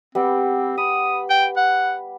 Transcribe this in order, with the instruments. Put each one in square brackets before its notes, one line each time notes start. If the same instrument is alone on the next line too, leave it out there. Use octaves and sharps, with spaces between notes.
[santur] G3 B3 [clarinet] C4
[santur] B5 [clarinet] D#6
[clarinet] G5
F#5